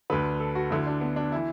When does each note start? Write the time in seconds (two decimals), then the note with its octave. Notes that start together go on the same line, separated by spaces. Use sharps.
0.10 D2 D3 B4
0.40 A4
0.55 F#4
0.70 D2 D3 E4
0.87 D4
1.01 B3
1.16 D4
1.32 E3 E4